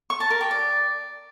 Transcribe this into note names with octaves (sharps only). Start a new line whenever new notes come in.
C#6
A5
A#4
G4
D5